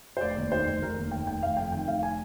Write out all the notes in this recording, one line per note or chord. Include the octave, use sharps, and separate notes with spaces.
C5
F1 D5
D#2
D#3 C5
F1
F1 A#4
D#2
D#3 G5
F1 G5
F1 F5
F2 G5
D#3 G5
F1 F5
G#5